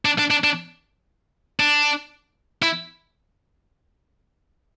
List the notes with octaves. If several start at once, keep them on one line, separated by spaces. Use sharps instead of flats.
D4
D4
D4
D4
D4
E4